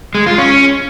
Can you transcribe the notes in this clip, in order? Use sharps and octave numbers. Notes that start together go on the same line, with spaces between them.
G#3
F4
C#4